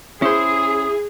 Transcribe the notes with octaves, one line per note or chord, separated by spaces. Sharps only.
C#4 E4 G#4 C5 D#6